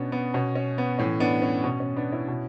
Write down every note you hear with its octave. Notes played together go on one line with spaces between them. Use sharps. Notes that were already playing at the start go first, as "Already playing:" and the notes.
Already playing: B2 B3 C#4 D4
B3
B2 C#4
C#4
B3
A2 E3 C#4
B3 D4
C#4
B2 C#4
C#4
B3 D4
C#4 E4
B2